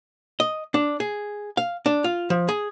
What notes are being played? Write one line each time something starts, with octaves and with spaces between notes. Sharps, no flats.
D#5
D4
G#4
F5
D4
F4
F3
G#4